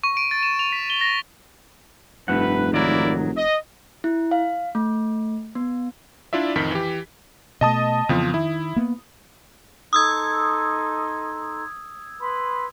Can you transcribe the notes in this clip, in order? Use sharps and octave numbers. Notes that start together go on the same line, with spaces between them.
C#6
D7
A6
E7
F7
B6
G7
A#6
F1 G2 A3 B4 F#5
G#2 D#3 F#3 A#3 E4 D5
D#5
E4
F5
A3
B3
D4 E4 F4 D5 E5
A1 F2 D#3 B6
E3 G4
B2 A3 D#5 A5 D#6
F2 C#3 E3 F3 B3
D#3 E4
A#3 B3
D#4 A4 C6 D#6 E6 G#6
B4 B5 C6